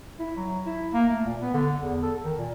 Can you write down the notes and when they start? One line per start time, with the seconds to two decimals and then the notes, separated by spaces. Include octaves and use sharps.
0.19 E4
0.37 F#3
0.66 E4
0.93 A#3
1.10 A3
1.26 A#2
1.40 B3
1.54 D3
1.82 E2
2.03 A4
2.24 D#3
2.38 A#2